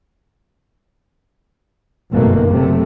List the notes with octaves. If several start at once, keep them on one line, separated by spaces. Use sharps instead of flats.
G1 F#2 B2 D#3 A3 A#3
F#1 C3 F#3 A3